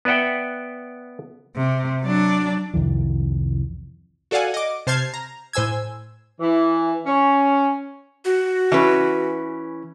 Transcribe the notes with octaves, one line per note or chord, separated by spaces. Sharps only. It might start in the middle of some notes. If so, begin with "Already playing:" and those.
B3 B4 D5 E5 F#5 G5
C3
F#3 D4
C2 F2 D#3 E3
F#4 A4 D5 F5 F#5 G#5
D#5 D6
C3 C5 A5 F6 G#6 C7
A#5
A2 C5 G#5 E6 G#6
E3
C#4
F#4
E3 C#4 B4